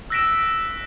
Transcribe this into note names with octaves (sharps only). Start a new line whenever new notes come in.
E6 F#6 A#6 B6 D7 E7